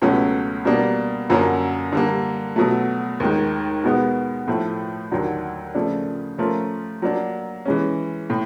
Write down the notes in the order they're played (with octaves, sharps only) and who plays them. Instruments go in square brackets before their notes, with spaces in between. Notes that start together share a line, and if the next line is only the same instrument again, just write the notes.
[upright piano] C#2 B2 F#3 A3 C#4
B2 G3 A#3 D4
F#2 D3 F#3 A#3 C#4
D3 G3 A#3
B2 F#3 A3
D#2 D#3 G#3
B2 G#3 B3
A2 F3 A3
D#2 D3 F#3
C#3 F3 A3 D4
F3 A3 C#4 F4 A#4
F#3 A#3 D4
E3 G#3 C#4
A2